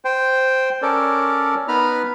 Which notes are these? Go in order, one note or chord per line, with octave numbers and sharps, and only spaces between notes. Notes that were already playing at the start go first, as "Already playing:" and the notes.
C5 G5
C#4 A4 A#4 D5
B3 D#4 B4 A#5 B5 F6